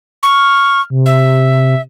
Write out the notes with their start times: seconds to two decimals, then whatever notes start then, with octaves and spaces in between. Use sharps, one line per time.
0.23 C#6 F6
0.90 C3
1.06 E5